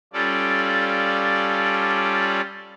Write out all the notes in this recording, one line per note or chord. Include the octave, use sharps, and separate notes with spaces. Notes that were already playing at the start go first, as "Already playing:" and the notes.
G3 C#4 F4 A4 D5